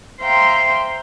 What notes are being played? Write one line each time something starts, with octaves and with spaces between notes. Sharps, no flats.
C5 E5 F5 G5 A#5 C6